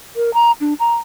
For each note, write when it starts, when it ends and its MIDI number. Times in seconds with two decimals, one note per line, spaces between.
0.16 0.33 70
0.34 0.51 82
0.61 0.74 62
0.80 0.95 82